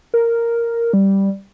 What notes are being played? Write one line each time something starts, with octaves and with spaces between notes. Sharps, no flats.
A#4
G3